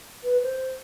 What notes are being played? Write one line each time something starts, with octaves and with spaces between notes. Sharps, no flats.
B4
C5